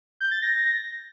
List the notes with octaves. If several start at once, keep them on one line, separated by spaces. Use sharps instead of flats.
G6
A6
A#6